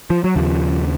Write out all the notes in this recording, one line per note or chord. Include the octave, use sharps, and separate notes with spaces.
F3
F#3
D#2 C#3 F3